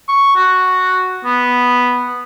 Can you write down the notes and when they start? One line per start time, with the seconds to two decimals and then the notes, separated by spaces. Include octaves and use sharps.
0.08 C#6
0.36 F#4
1.25 B3